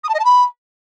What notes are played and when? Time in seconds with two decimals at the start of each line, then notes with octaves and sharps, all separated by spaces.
0.04 D#6
0.09 A5
0.14 D#5
0.19 A5
0.25 B5